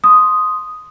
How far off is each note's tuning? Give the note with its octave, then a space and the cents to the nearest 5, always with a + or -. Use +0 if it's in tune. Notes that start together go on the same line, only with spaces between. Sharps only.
C6 +0 D#6 +0